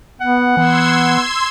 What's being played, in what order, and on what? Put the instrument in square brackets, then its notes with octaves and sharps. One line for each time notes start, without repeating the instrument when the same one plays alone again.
[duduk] B3 [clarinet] F#5
[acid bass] E3 [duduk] B3 [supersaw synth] C6 E6 G#6